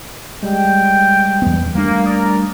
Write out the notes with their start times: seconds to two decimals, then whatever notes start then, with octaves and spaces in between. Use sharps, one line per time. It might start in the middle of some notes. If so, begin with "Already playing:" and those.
0.43 G3 G#3 G5
1.42 E2 B3
1.75 G3 A3 A#3 D4
2.06 A#4 D5 A#5 D#6